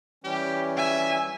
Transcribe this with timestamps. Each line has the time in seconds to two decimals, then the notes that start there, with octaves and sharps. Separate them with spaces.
0.24 E3 G3 C#4 G4
0.77 E5 G#5